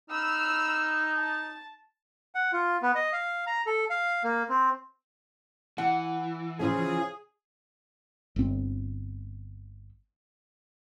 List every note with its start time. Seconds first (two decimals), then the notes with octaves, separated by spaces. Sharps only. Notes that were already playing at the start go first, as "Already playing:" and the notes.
0.10 D#4 B5 E6 F6
1.19 A5
2.35 F#5
2.52 F4
2.82 B3
2.95 D#5
3.13 F5
3.47 A#5
3.66 A4
3.90 F5
4.24 A#3
4.49 C4
5.78 E3 F#5
6.60 C#3 F3 F4 G#4
8.36 G1 C4